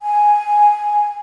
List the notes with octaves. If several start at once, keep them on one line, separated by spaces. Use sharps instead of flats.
G#5